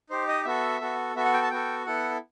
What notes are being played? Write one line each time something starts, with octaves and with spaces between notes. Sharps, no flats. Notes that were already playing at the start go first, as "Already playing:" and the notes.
D#4 G4 C5
D#5
B3 F#4 A4 E5
B3 F#4 A4
B3 F#4 A4 E5
F#5
G5
A5
B3 F#4 A4 G5
B3 E4 A4 F#5